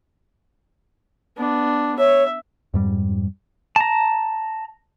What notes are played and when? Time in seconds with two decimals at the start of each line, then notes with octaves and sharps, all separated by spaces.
1.37 B3 D4
1.99 C#5 E5
2.74 F2 G#2 G3
3.76 A5 A#5